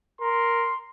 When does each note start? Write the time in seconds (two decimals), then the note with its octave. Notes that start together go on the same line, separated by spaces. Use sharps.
0.21 A#4 C6